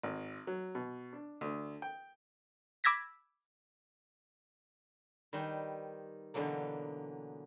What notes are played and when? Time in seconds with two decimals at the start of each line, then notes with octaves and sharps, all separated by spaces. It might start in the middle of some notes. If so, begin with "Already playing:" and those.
0.03 G#1
0.47 F#3
0.75 B2
1.13 D4
1.41 D2
1.82 G5
2.84 B5 D6 E6 G#6 A#6 B6
5.33 D#3 G3 D#4 B4 C5 G#5
6.34 B2 D3 E3 F#3 A#3